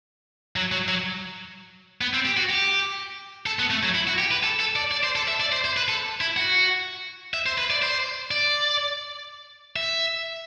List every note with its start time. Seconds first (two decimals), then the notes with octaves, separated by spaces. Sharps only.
0.56 F#3
0.72 F#3
0.88 F#3
2.01 B3
2.14 C4
2.25 G4
2.37 F#4
2.50 G4
3.46 A4
3.59 B3
3.71 A3
3.83 F#3
3.95 E4
4.07 F#4
4.19 G4
4.31 B4
4.43 A4
4.60 A4
4.76 D5
4.92 D5
5.04 C5
5.16 A4
5.28 E5
5.40 D5
5.52 C5
5.65 C5
5.77 B4
5.89 A4
6.21 E4
6.37 F#4
7.34 E5
7.46 C5
7.58 B4
7.70 D5
7.82 C5
8.31 D5
9.76 E5